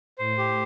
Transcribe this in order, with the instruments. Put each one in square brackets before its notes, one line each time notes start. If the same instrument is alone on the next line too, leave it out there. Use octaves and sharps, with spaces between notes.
[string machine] A2 [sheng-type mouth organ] C5
[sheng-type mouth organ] G4